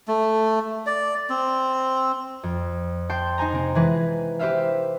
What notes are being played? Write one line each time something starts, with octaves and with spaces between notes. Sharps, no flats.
A3
D5
C4
F2
G5 A5 C6 G6
D#4 C5 G#5 A#5
C3 C4
E3 G#3 G#4 B4
G4 B4 C5 E5 F5